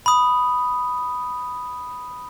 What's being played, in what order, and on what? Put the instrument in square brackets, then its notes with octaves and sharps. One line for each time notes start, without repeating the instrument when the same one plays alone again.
[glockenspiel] B5 D#6